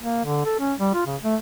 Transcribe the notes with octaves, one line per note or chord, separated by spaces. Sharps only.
A#3
D3
A4
C#4
G3
F4
C#3
A3